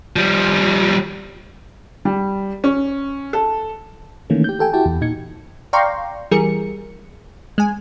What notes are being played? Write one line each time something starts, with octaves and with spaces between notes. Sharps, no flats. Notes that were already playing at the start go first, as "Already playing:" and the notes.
F3 G3
G3
C#4
A4
D#3 E3 A3 A#3 C#4
G4 G6
G4 A4 G5 G#5
E4 F#4 G4 G5 A5
E2
A#2 D#4 G#6 C#7
D5 F5 G5 A#5 C6 C#6
E3 G3 G#4 A#4 C#7
G#3 G#5